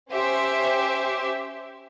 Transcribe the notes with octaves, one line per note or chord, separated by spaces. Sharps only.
C#4 G4 C5 E5